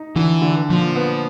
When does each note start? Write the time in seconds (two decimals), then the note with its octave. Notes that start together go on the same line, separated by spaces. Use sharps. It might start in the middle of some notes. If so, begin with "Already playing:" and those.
Already playing: D#4
0.16 D3 E3
0.42 D3
0.69 A#2 F3
0.96 B3